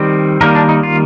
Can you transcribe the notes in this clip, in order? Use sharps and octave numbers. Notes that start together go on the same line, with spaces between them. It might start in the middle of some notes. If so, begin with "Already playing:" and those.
Already playing: D#3 G3 C4
D#3 G3 A#3 A#4
D4
D#4
F4